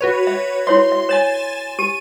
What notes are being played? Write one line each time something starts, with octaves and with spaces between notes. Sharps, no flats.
F#4 B4 C#5
E5
E4 C#5 E5 C6
E5
C#5 G#5 A6 E7
G4 D#7